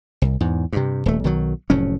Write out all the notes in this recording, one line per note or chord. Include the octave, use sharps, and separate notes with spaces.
C2
E2 G#2
G2 C3
D#1 A3
B1 D#3 F#3
F1 A2 F#3 C#4